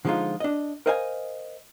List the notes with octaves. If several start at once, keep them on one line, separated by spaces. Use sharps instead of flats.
D3 F3 G#3 C4 D#4 F4
D4 D#5
A#4 C5 D#5 F5 G5 G#5